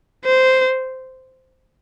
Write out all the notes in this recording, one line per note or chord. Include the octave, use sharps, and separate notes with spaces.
C5